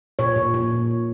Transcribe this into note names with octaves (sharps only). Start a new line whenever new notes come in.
A#2 C#5
A#2
A#2